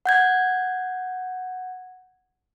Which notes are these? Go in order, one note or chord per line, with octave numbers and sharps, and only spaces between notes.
F#5 G6 G#6